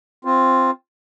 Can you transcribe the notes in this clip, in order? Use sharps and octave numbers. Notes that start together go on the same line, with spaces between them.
C4 F4